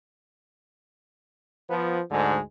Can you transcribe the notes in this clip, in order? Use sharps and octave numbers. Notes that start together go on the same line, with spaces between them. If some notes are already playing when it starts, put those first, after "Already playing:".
F3 B3
D2 G#2 D3 G#3